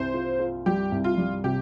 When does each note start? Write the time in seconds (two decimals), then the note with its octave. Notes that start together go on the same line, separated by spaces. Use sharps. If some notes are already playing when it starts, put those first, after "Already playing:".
Already playing: C2 C5
0.14 F4
0.40 F4
0.66 G3 G4
0.92 C2
1.04 F4
1.17 G3
1.44 C3 G4